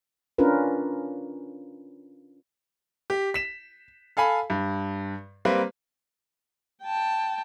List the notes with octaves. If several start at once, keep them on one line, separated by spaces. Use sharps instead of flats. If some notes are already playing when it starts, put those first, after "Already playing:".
C#4 D4 F4 A#4 B4
G4
B6 E7
A4 F5 G#5 B5
G2
G3 A#3 C4 B4
G5 A5